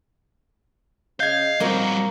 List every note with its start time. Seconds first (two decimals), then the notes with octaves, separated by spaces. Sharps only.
1.20 C#3 C#4 D#5 F5 G6 G#6
1.60 A#2 F3 G3 A#3 C4 D#4 F#4 C#5